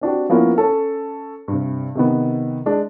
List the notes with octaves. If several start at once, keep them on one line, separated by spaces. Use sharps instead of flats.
C4 D4 F#4 G4
F3 A#3 B3 C#4 E4 F4
C#4 A4
G2 C3
C3 D#3 B3
G#3 D4